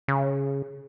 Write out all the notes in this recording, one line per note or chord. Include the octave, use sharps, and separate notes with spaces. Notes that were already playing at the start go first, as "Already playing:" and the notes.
C#3